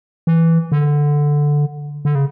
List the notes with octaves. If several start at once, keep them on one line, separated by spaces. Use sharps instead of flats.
E3
D3
D3
C#3